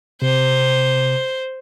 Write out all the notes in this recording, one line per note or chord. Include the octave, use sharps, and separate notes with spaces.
C3 C5